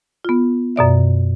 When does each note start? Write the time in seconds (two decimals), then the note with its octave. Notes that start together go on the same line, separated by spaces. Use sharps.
0.25 B3 F4
0.76 F#2 B2 D5 E5